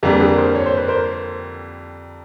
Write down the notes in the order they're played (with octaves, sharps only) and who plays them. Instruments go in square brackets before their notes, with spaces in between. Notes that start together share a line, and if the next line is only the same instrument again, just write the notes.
[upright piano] F2 D3 G3 A#3 [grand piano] G#4 A#4
[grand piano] B4
G#4 A#4
A#4 C5
C#5
C5
B4
A#4 C5